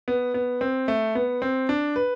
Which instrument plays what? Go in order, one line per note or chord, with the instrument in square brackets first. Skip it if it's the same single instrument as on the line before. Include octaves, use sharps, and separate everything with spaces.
[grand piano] B3
B3
C4
A3
B3
C4
D4
B4